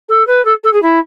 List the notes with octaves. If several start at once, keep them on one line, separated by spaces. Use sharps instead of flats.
A4
B4
A4
A4
G#4
E4